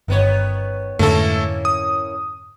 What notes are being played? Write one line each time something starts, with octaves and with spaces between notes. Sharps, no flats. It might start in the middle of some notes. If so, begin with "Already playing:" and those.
G1 D#3 B3 C#5
F2 G#2 D3 A3 A#3 C#4 E4 A4
D#6